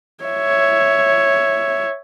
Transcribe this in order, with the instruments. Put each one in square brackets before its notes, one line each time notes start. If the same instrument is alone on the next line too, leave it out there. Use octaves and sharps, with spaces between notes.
[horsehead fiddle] C#5 E5